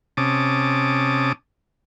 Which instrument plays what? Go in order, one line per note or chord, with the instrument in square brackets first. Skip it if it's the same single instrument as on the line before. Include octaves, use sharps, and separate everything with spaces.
[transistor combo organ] C3 C#4 A5 D6 D#6